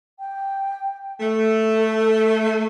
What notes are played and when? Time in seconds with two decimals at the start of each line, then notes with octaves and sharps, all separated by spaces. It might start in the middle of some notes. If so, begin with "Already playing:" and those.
0.19 G5
1.20 A3 A4